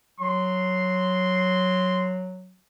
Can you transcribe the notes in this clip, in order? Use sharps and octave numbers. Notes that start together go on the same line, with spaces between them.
F#3 C6